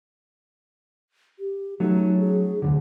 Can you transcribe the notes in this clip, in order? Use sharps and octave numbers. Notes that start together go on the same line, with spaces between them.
G4
F#3 A3 C#4 D#4
G#4
D2 G#2 D3